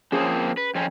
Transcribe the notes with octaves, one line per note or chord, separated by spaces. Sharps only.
F3 A#3 C4 C#4 G#4
B4
F2 C4 C#4